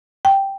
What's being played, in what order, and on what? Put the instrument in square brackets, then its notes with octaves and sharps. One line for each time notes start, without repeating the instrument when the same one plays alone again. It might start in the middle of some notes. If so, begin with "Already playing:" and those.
[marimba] G5